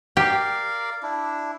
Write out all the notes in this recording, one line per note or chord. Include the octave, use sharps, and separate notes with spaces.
G4 A#4 D5 F5
D4 E4